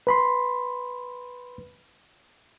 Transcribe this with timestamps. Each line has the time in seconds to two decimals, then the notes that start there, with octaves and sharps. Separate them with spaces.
0.07 B4 B5 C6